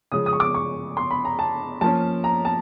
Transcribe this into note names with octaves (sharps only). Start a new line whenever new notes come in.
C#3 F3 G#3 D#6
D#6
C#6
D6
C#6
C6
B5
A#5
A5
F3 A#3 C#4 A5
A#5
A5